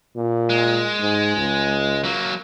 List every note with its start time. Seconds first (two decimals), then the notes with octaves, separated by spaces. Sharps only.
0.16 A#2
0.50 G#3
1.00 G#2
1.36 C#2
2.04 F#3 A#3